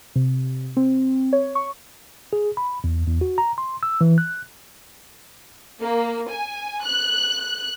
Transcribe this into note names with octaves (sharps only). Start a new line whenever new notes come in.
C3
C4
C#5
C#6
G#4
B5
E2
E2
F#4
A#5
C6
E6
E3
F#6
A#3
G#5
F#6